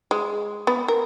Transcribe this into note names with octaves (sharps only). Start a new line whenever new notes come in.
G#3
B3
A#4